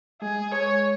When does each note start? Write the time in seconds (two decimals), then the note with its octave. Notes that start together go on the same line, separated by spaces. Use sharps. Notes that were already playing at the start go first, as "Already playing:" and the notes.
0.21 G#3 G#4
0.52 C#5